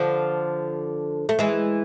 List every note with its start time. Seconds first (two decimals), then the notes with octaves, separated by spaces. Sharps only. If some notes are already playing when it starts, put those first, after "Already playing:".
Already playing: D3 F3
1.29 A3
1.39 E3 G#3